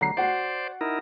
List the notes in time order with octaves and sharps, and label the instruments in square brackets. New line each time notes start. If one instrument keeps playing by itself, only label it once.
[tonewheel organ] D3 F#3 [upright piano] A#5 C7
[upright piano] F#4 F#5 [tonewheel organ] C5 D5
[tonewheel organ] D#4 E4 A#4